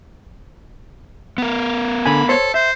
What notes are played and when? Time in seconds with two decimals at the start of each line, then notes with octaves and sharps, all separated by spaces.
1.38 B3 A#4
2.06 D3 G#5 B5
2.29 A4 C5 C#5
2.54 C5 E5